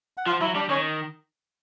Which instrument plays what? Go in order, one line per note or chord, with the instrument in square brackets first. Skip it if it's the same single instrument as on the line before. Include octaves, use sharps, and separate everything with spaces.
[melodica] F#5
[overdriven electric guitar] F3 [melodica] F4 F5
[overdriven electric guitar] F#3 [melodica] E4 E5
[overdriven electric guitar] G3 [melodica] D4 D5
[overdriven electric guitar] D#3 [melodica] C#4 C#5